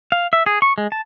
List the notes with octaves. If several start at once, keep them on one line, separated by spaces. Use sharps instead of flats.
F5
E5
G#4
C#6
G#3
A5